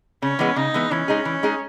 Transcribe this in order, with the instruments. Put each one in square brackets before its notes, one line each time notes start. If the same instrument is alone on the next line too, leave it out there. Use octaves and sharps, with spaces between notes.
[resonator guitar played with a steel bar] C#3 [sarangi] C#4
[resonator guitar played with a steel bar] E3 G#3 B3
[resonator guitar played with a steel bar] C#3 [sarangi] D#4
[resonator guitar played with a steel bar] E3 G#3 B3
[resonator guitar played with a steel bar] E3 [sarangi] C#4
[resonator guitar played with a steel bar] G#3 D#4 G#4
E3
G#3 D#4 G#4